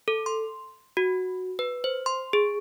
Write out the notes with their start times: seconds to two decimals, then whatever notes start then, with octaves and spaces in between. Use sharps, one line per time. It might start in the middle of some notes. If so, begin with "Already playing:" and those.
0.08 A4
0.26 C6
0.97 F#4
1.59 B4
1.84 C5
2.06 C6
2.33 G#4